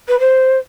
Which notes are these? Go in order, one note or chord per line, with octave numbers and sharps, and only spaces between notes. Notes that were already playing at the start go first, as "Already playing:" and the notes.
B4
C5